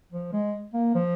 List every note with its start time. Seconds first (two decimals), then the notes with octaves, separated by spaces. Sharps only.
0.13 F3
0.33 G#3
0.74 A#3
0.95 F3